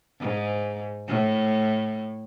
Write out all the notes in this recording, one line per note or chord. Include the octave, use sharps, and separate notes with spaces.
G#2
A2